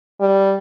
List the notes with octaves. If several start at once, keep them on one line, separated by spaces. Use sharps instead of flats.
G3